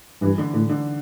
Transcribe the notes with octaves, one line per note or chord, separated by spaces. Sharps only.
G2 E3
D3
A2 D3
D3